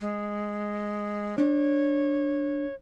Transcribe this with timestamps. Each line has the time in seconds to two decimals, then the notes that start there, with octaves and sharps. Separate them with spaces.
0.01 G#3
1.38 D4 C#5